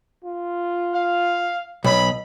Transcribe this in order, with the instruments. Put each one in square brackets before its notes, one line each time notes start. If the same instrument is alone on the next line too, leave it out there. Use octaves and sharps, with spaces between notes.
[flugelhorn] F4
[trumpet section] F5
[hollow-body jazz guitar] B1 [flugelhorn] D#5 [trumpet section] B5